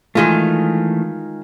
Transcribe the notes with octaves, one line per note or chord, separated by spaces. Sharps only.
D#3 E3 G#3 A3 F4